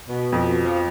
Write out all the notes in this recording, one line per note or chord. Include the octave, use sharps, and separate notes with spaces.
B2
F2
F3